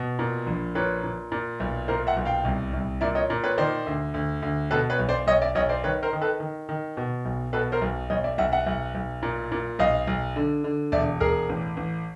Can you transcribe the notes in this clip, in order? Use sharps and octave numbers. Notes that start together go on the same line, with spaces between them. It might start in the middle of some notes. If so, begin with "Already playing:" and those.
Already playing: B2
A#2
A#1
A#2 B4 C#5
A#2
A#2
B1
A#2 A#4 C5
E5 F#5
B1
F5 G5
C2
C2
A#2 D5 E5
C#5 D#5
A#2
B4 C#5
D#3 C5 D5
D2
D2
D2
B2 A4 B4
B4 C#5
B1
C5 D5
B1 C#5 D#5
D5 E5
B1 C#5 D#5
C5 D5
D#3 B4 C#5
A#4 C5
D#3
A4 B4
D#3
D#3
B2
B1
B2 A4 B4
A#4 C5
B1
B1 C#5 D#5
D5 E5
B1 E5 F#5
E5 F#5
B1
B1
A#2
A#2
B1 D#5 F5
B1
D3
D3
E1 D5 E5
E1 G#4 A#4
A1
A1